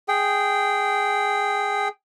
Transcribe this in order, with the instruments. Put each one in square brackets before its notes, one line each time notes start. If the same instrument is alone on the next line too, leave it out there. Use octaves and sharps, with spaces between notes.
[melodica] G#4 G5